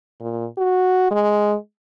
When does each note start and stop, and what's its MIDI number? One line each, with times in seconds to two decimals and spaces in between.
0.20 0.46 46
0.58 1.09 66
1.11 1.56 56